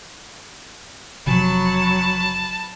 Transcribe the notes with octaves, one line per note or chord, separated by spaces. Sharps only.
F#1 C3 F3 F#3 A5 B5